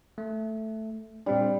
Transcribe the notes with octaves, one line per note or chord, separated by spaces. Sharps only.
A3
A#2 G3 C4 D4